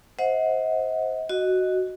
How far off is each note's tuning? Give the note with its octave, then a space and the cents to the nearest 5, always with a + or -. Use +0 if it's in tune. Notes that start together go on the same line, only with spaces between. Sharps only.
C5 +0 D#5 +40 F#5 -20
F#4 +5 D#5 +0